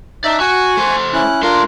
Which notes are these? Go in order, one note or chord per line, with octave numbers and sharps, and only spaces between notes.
D#4 D5 E5 A5
F#4 G#5 C#6
A3 C5
C#4 E4 F#6
A3 D4 F4 A#4 C6